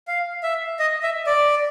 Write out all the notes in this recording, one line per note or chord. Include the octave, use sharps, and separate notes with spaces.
F5
E5
D#5
E5
D5